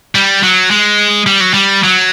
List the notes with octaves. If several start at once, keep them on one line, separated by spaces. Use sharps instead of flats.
G3
F#3
G#3
G3
F#3
G3
F#3